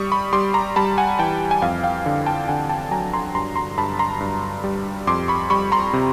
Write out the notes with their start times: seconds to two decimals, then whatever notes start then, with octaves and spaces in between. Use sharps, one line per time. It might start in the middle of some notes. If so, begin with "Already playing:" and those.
Already playing: G3 C#6 D#6
0.12 B5 C#6
0.33 G3 C6 D6
0.54 A#5 C6
0.76 G3 A5 B5
0.98 F#5 G#5
1.19 E3 G5 A5
1.51 G#5
1.62 F2 F5 G5
1.83 F5 G5
2.06 D3
2.26 G5 A5
2.48 D3 F#5 G#5
2.69 G5 A5
2.91 F#3 G#5 A#5
3.13 A#5 C6
3.35 G2 A#5 C6
3.56 A#5 C6
3.77 G2 A5 B5
3.99 A#5 C6
4.20 G2
4.64 G3
5.07 F2 C6 D6
5.28 B5 C#6
5.50 G3 B5 C#6
5.72 A#5 C6
5.93 C3